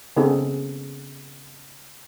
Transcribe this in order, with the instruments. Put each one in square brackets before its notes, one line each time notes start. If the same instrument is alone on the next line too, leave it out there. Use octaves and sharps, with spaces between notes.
[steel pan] C#3 B3 C4 D#4 G#4 A4